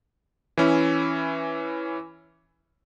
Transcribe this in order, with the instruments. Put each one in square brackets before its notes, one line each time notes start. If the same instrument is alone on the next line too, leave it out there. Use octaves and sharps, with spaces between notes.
[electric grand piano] E3 C#4 E4